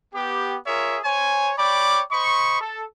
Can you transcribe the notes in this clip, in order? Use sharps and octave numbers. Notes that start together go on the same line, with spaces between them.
B3 G4
F4 G#4 A#4 C#5 E5
C5 C#5 G#5
C#5 D5 G5 B5 D6
C5 D#5 B5 C#6
A4